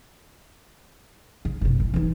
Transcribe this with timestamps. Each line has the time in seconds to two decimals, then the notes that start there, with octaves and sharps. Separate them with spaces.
1.45 C#3
1.61 F#1 B2
1.80 A2
1.94 E3 D#4